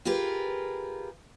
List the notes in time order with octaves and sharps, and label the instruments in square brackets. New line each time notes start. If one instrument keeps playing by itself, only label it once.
[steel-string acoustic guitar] F4 G4 G#4 A#4 B4